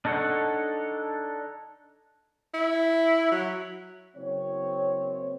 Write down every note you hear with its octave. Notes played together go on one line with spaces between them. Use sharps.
D4 D#4 A4 C#5 F#5
E4
F#3
F#1 C4 C#5